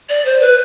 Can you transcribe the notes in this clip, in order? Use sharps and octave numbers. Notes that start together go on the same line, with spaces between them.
D5
C5
B4